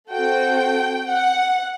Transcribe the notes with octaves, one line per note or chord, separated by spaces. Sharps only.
C4 F#4 A4 G5
F#5